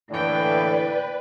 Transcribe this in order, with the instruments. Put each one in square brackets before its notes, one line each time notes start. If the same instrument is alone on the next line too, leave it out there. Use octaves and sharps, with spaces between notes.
[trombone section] A2 D3 E3 [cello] A#3 G5 [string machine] B4 [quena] D5